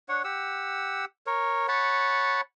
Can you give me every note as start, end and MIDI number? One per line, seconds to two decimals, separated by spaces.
0.09 0.22 62
0.09 0.22 73
0.09 0.22 78
0.24 1.05 67
0.24 1.05 78
0.24 1.05 88
1.27 1.67 70
1.27 1.67 73
1.68 2.41 73
1.68 2.41 78
1.68 2.41 81
1.68 2.41 83